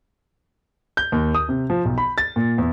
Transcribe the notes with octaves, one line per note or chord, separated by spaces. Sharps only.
G6
D#2
D#6
C3
F3
B1
B5
A6
A#2
E2